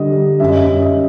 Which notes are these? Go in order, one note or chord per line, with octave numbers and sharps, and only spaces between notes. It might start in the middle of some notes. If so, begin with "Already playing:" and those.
Already playing: D3 G3 D#5
G3
F#2 E5
D#5
E5
F#2
D#5